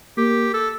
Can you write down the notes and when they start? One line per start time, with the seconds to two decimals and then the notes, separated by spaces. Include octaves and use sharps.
0.18 A#3 G4
0.54 A4